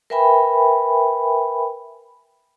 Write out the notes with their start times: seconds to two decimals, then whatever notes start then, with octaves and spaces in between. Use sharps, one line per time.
0.10 A#4 B4 E5 G5 G#5 B5